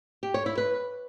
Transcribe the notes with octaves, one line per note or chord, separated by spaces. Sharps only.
G4
C#5
E4
B4